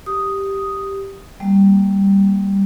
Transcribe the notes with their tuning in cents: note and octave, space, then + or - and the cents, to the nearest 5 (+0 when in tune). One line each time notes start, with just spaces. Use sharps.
G4 +0 D#6 +0
G3 +0 A#3 +0